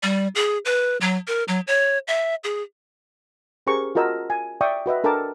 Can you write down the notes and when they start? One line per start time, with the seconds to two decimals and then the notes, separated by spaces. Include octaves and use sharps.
0.03 G3
0.35 G#4
0.65 B4
1.01 F#3
1.27 A#4
1.48 F#3
1.67 C#5
2.08 E5
2.44 G#4
3.67 C#4 G4 G#4 A#4 C5 C#6
3.95 F4 F#4 A#4 D#5 A5 E6
4.30 G#5
4.61 D5 E5 G5 C#6 D#6
4.86 F#4 B4 D#5 E5
5.04 D4 A4 A#4 G5 A5 D6